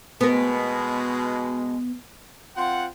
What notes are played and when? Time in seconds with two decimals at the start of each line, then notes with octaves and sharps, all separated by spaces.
0.21 B2 G#3 B3 A#4
2.56 C4 F4 F#5